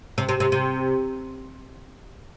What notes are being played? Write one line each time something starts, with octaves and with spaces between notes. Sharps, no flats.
C3
C3
C3
C3